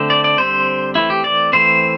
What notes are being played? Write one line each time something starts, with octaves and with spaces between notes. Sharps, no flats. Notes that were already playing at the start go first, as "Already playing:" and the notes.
Already playing: D3 A3 C4
D5
D5
D3 G3 C4 C5
E3 A3 C4 E4
G4
D5
E3 A3 C4 C5